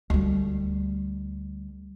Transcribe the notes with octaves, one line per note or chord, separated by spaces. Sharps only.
D2 G3